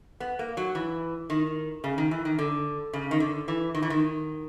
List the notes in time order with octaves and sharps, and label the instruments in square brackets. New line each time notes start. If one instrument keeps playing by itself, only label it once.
[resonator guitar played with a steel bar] B3
A#3
F#3
E3
D#3
C#3
D#3
E3
D#3
D3
C#3
D#3
D3
E3
D#3
E3
D#3